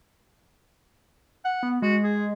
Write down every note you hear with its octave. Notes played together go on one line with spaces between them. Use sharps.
F#5
B3
G#3 F#4
G#4